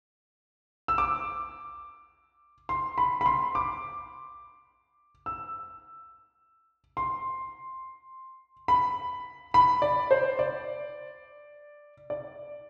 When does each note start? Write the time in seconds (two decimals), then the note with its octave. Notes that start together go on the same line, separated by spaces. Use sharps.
0.88 E6
0.98 D6
2.69 C6
2.98 B5
3.21 B5
3.26 C6
3.55 D6
5.26 E6
6.97 C6
8.68 B5
9.54 B5
9.82 D5
10.11 C5
10.39 D5
12.10 D5